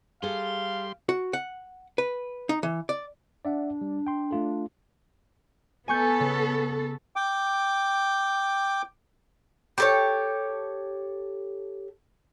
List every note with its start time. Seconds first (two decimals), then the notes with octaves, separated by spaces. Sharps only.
0.23 G3 G#4 A4 F5 C6
1.09 F#4
1.33 F#5
1.98 B4
2.49 D#4
2.63 E3
2.89 D5
3.45 D4 D5 E5 F#5
3.81 G3
4.07 G5 C6
4.31 A3 F4 A4
5.88 B3 A4 G#5 C#6 G6
6.20 C#3
7.16 G5 D6
9.78 G4 A4 C#5